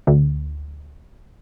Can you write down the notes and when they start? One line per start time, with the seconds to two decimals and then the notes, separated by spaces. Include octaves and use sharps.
0.07 D2